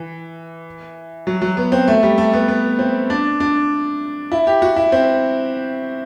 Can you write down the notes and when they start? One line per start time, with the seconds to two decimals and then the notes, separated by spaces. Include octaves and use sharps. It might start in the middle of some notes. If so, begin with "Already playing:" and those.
Already playing: E3
1.27 F#3
1.42 F#3
1.57 B3
1.72 C4
1.88 A3
2.03 G3
2.18 A3
2.33 B3
2.48 B3
2.79 C4
3.10 D4
3.40 D4
4.32 E4
4.47 G4
4.62 F#4
4.76 E4
4.92 C4